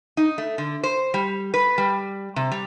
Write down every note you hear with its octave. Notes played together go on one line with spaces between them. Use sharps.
D#4
A3
D3
C5
G3
B4
G3
C3
G3